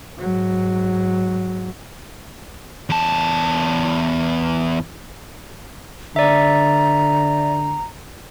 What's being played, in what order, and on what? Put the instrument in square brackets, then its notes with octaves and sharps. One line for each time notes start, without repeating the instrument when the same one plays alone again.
[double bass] G#2 F#3
[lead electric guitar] E2 A5
[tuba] D3 [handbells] D5 E5 [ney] A#5